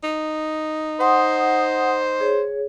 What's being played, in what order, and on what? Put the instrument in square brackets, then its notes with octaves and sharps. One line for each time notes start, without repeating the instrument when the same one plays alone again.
[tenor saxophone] D#4
[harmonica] C5 [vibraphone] F#5 C6 D#6
[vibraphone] G#4 C#5